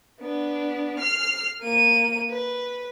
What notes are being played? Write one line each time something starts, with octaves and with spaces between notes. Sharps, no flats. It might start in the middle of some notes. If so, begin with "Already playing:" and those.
B3 D4
F6 C7
A#3 D#7
B4